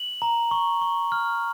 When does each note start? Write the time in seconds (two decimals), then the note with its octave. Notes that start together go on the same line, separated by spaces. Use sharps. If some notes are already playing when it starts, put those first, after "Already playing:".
Already playing: F#7
0.22 A#5
0.51 C#6
0.81 C#6
1.12 F6